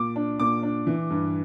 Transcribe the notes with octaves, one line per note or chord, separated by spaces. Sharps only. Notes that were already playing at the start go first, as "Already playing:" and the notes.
Already playing: A#2 D6
D4
A#2 D6
D4
E3
G2